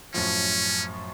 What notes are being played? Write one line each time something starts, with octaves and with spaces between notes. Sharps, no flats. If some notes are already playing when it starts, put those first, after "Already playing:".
F#2 A2 F3 C#4